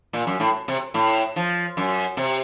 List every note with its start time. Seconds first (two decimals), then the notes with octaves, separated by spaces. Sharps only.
0.13 A#2
0.27 F#2
0.40 A2
0.68 C3
0.94 A2
1.36 F3
1.77 F#2
2.17 C3